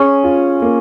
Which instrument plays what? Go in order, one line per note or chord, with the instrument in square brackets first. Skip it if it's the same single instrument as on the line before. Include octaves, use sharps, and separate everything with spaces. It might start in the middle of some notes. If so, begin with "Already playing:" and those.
Already playing: [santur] C#4 [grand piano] G#4
[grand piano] F4
A#3